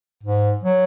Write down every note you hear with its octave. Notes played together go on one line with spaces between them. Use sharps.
G#2
F#3